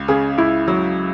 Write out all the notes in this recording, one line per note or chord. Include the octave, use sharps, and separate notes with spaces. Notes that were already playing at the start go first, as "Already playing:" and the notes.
Already playing: C#2
C#3 G#4
C#2 E4
F#3